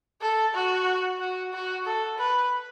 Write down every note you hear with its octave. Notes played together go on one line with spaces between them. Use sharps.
A4
F#4
F#4
F#4
A4
B4